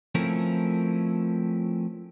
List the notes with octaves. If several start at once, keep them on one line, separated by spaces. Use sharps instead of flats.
F3 A3 C4 C#4 E4 A#4